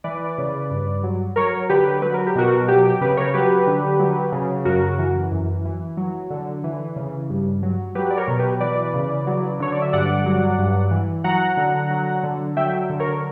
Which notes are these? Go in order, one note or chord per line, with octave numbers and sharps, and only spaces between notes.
E3 B4 D5
C#3
G2
F#3
F#3 A#4 C#5
D3 G4 B4
F#3 B4
A#4
G4
B2 F#4 A#4
F#3 G4
G4
C#3 G4 B4
A#4 C#5
F#3 G4 B4
D3
F#3
C#3
F#2 F#4 A#4
E3
F#2
E3
F#3
D3
E3
C#3
G2
F#3
F#3 G4 B4
D5
A#4 C#5
B2
G4 B4
E3 B4 D5
C#3
F#3
D3 C#5
D5
E5
G2 D5 F#5
F#3
G2
E3
F#3 F#5 A#5
D3
F#3
D3
F#3 E5 G5
D3
A#4 C#5